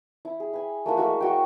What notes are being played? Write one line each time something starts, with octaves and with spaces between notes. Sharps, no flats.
E4
G#4
G#5 B5
A3 A#3 E4 F#4
G#3 A#3 E4 F#4
F#4 C#5 D5 G5